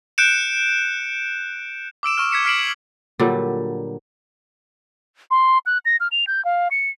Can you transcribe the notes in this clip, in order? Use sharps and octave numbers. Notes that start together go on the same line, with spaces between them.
F#6 G6 C#7 D7 E7
D6 E6 D7 E7
C#6 E6 F6
G#6 B6 C#7 E7
F6 B6 C7 D7 E7 F#7
F#7
A#2 D3 F#3 G3
C6
F#6
A#6
F6
F7
G6
F5
C#7